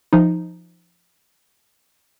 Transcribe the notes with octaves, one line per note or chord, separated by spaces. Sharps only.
F3 D#4